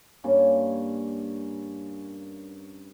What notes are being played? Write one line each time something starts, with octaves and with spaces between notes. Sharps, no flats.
G2 A#3 C#4 C#5